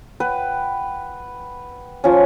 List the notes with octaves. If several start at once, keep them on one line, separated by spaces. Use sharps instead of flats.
B4 F#5 G5
F3 C#4